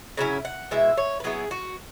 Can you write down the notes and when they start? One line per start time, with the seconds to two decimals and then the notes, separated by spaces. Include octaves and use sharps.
0.17 C#3 F#3 C#4 E4
0.45 F#5
0.71 B2 G#3 E4 E5
0.97 C#5
1.20 B4
1.24 F#3 B3 E4 G#4
1.51 F#4